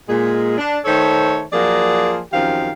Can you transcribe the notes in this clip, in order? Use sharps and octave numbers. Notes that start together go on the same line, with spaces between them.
A#2 G#3 G#4
D4
D#3 A3 D#4 A4 C5 C#5
F3 F#3 A#3 G#4 A#4 D5
F#2 D#3 F3 C4 G4 F5